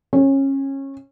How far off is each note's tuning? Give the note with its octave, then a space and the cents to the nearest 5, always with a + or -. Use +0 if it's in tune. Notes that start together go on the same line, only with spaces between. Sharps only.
C#4 -25